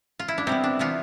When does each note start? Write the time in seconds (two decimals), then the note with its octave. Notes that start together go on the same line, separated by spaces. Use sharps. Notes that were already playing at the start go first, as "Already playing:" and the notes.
0.19 F4
0.28 E4
0.38 D4
0.47 C3 G3 B3 C4
0.64 D4
0.79 C3 E3 B3 F4